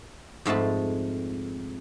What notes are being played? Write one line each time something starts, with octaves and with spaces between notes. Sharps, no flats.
F2 G#2 A3 A5 B5